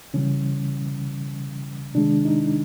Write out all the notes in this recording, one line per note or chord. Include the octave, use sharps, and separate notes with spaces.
C#3 E3 G3 C#4
C3 D#3 G#3 D4
D#4